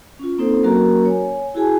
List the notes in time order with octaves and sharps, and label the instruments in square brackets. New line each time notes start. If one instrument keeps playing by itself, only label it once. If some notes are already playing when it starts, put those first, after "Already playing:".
[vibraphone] C#4 F4
A#3 C4 D#4 A4 C5
F#3 A#3 C#4 F#4 A#4 A#5
C#5 G#5
E4 F#4 G#4 G#5 A5